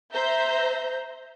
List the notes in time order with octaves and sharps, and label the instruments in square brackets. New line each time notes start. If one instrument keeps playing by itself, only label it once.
[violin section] C5 E5 A#5 G6